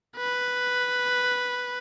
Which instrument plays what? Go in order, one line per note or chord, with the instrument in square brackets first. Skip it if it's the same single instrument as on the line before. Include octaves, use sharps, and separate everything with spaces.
[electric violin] B4